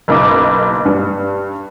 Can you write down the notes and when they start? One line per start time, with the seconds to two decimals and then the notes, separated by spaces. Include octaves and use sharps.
0.08 F#1 B1 D6
0.85 G2